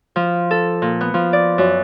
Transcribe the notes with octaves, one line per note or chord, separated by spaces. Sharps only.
F3
A4
A#2
B3
F3
D5
F#2